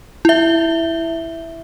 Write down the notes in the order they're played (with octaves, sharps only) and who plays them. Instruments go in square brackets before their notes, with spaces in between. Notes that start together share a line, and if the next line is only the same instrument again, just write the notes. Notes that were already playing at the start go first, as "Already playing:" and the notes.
[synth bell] E4 E5